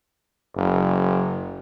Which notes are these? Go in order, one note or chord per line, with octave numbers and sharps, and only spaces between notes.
F#1